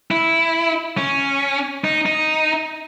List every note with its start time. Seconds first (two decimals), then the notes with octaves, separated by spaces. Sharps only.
0.11 E4
0.97 C#4
1.84 D#4
2.06 D#4